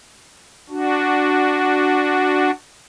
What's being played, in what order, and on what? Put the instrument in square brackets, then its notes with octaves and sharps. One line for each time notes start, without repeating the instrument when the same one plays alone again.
[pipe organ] D4 F#4